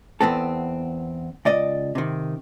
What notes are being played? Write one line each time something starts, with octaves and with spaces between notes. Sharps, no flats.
E2 B3 C4 A4
C#2 D5 D#5
C3 D#3